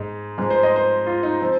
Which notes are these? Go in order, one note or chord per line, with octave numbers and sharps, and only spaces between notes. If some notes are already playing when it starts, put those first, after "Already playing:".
Already playing: G#2 G#3
G#2 F3 G#3 G#4
C5
D#5
C5
F4
D#4
F3 C4